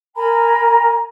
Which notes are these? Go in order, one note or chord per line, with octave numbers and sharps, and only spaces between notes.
A#4 G#5 A#5 B5